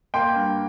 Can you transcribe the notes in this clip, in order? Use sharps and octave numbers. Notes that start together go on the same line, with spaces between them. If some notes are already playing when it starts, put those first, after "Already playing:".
A#3 G5 C6
G2